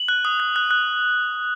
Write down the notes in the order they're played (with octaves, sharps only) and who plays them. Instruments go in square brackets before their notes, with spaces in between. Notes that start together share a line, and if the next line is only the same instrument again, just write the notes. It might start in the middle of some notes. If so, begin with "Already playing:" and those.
Already playing: [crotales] F#7
F#6
D#6
F#6
F#6
F#6